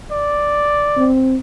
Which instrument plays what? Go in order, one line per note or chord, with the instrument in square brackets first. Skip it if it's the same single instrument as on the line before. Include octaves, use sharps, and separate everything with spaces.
[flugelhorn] D5
[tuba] C4